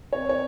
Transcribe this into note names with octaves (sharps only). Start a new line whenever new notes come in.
C3 C#5
C#5